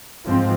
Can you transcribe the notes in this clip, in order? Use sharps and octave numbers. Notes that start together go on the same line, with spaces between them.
G#2 F3 C4